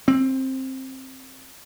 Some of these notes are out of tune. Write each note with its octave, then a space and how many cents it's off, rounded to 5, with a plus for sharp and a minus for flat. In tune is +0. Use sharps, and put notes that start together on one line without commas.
C4 +15